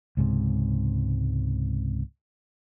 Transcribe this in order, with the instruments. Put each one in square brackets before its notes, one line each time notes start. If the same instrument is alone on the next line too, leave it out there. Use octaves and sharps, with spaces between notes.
[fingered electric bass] C#2 G#2 C3